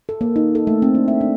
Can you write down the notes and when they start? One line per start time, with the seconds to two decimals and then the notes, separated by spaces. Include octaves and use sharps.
0.09 A4
0.21 A#3
0.36 D#4
0.55 A4
0.67 A3
0.82 C4
0.95 D4
1.08 E5
1.21 D4